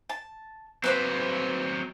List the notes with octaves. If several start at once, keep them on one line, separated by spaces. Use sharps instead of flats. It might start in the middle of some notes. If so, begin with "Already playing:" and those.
A5
F#3 C4 B4 C5 B5